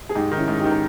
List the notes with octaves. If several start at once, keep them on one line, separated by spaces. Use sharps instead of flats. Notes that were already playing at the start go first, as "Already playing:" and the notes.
G#4
G#2 D#4 G4
D#3
C#4 E4
G#2
D#4 G4
D#3
A#4